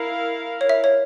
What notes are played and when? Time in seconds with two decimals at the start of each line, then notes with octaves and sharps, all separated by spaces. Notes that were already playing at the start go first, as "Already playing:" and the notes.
Already playing: E4 A#4 F5
0.61 C#5
0.69 E5
0.84 C#5